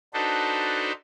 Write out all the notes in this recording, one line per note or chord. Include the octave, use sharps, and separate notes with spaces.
D4 D#4 F#4 A4 B4 C5